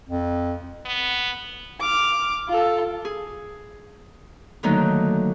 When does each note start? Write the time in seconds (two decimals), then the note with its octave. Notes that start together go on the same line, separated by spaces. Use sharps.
0.08 F2
0.86 B3
1.80 D6 F6
2.48 F4 A4
3.05 G#4
4.63 D3 D#3 F#3 A3 A#3 D#4